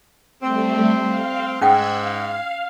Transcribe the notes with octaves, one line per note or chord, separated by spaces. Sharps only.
G3 A3 C4
F5
G#2 C#4 F#5 G5 E6 F#6 G#6
F5